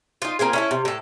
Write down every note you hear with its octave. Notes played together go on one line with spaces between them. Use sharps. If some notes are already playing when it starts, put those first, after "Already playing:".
D#4 F4
A#3 C4 F4 G#4
C#4 E4 A4
C3
A2 A4